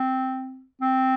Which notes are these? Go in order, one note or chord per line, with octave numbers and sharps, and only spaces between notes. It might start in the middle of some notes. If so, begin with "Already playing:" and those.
Already playing: C4
C4